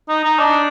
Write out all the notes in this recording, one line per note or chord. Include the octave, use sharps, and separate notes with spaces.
D#4
D#4
D4